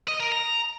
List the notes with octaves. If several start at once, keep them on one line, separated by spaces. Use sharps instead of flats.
D#5
A#4
A#5